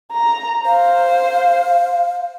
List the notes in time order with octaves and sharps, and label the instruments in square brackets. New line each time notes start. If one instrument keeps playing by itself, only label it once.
[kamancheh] A#5
[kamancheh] C5 [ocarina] F5